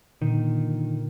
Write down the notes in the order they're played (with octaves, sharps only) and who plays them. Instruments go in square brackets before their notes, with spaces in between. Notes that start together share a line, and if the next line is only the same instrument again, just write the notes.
[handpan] A#2 D3 [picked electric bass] D#3